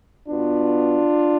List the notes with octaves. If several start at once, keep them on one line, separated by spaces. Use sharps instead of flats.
B2 B3 D4 F4